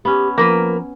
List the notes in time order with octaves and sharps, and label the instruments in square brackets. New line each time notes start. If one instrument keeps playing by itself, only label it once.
[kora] B3 C#4 [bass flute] G4
[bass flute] F3 [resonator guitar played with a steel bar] A#3 A#4 B4